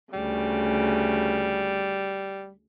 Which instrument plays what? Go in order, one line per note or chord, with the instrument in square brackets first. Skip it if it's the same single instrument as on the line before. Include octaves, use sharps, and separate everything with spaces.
[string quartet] D2 C#3 [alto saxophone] G3